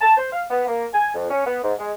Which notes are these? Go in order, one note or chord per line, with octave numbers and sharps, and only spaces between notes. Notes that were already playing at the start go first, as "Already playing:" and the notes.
A5
C5
F5
B3
A#3
G#5
F2
C#4
B3
G#2
G#3